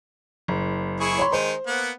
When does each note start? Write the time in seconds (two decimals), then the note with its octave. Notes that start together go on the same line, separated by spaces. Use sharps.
0.48 F#1
1.00 E4 G#4 C#6
1.18 C#5 B5 C6
1.32 D#3 G#3 D#4 C5
1.67 A#3 B3 F#5